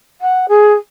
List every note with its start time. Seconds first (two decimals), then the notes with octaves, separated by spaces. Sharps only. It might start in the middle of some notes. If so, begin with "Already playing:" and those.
0.21 F#5
0.48 G#4